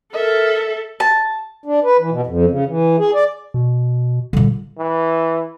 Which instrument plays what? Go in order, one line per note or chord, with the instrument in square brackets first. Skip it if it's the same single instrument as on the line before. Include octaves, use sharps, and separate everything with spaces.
[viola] A4 [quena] A#4 [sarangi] E5
[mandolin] A5
[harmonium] D4
B4
E3
B2
F2
C#3
E3
G#4
D5
[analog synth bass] B2
[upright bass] A#2 G3 [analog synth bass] D3
[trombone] E3